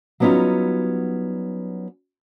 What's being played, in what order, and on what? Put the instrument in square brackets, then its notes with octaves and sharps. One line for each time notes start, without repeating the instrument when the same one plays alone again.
[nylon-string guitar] F#3 G3 B3 C#4 D#4 F4